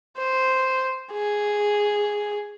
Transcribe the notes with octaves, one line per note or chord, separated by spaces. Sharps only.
C5
G#4